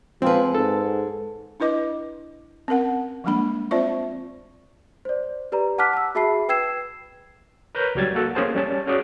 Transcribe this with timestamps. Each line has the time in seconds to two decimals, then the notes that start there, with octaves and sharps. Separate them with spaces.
0.22 F3 G#3 C4 B4
0.54 G#2 A4
1.60 D4 E4 B4 D#5 D6
2.68 C4 C#4 A#4 F#5
3.24 F3 G3 G#3 A#3 D4 B5
3.71 C4 F4 C5 D5 E5 C#6
5.05 C5 D5
5.52 G4 B4 D5 A#5
5.78 F#5 A5 D6 F6 F#6 B6
5.93 A5 E6
6.15 F#4 G#4 E5 A5 B5 C7
6.49 B4 G5 E6 G#6 C7 E7
7.75 A#4 B4 C#5 A#5 G6
7.95 C#2 F#3 G3 G#6 A6
8.15 A#3 F#4 A4
8.35 A#3 C#4 G#4 C5 A5
8.55 G3 C#4 A5
8.86 C#4 F#4 G#4 D5